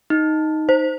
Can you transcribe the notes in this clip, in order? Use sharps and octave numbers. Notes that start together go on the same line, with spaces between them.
D#4
C5